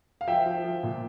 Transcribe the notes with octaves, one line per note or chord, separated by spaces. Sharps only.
F5
F3 E5 G5
F3
F3
A#2